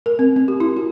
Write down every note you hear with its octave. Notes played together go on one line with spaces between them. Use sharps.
A#4
C4
C4
G4
E4
F#4